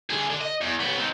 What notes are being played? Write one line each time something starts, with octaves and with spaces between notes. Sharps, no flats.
D3 G#4
D3
D#5
E2
C#3 B3
C4 D#4